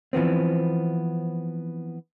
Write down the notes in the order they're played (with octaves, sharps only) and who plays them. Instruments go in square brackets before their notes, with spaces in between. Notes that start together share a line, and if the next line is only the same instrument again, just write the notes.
[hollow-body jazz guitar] E3 F3 B3 C4